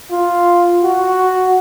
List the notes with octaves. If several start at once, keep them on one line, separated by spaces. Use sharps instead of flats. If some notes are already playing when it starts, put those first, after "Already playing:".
F4
F#4